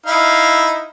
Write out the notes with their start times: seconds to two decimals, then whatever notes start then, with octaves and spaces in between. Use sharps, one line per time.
0.06 D#4 E4 F5